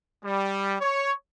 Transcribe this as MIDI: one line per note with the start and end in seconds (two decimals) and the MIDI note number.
0.24 0.76 55
0.81 1.12 73